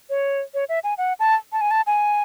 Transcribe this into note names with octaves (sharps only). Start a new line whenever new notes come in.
C#5
C#5
E5
G#5
F#5
A5
A5
G#5
A5
G#5